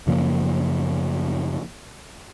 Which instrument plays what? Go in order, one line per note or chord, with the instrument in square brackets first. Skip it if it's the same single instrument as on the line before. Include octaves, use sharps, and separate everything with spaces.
[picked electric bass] F#2 C#3 F3 A#3